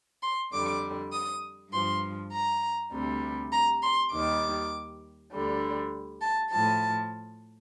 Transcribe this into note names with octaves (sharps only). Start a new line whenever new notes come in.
C6
F2 D3 G3 D6
D#6
G2 F3 C6
A#5
D2 C3 G3
A#5
C6
D#2 D#3 G3 D6
D2 D3 G3
A5
A2 F3 A5